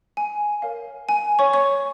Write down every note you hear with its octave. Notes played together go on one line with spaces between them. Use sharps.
G#5
A#4 C#5 F5
G#5
C#5 C#6
C#5 C#6